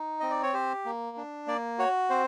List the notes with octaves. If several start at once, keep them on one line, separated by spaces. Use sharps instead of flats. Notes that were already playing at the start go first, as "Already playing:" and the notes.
Already playing: D#4
C4 D#5
D5
C#5
G4 C5
A#3
D4
A#3 D5
F#4 C#5
C4 C5